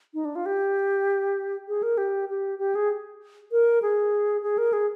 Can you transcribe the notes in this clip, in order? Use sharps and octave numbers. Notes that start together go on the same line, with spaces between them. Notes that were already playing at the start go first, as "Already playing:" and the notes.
D#4
D4
F4
G4
G#4
A#4
G4
G4
G4
G#4
A#4
G#4
G#4
A#4
G#4